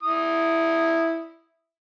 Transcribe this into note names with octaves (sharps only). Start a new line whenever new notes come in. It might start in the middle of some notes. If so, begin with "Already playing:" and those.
E4 D#6